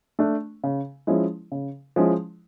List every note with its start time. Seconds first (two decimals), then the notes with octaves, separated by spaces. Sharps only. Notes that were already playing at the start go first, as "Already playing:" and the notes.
0.19 A3 D4
0.64 C#3
1.07 F3 G#3 C#4 E4
1.52 C#3
1.96 F3 G#3 C#4 E4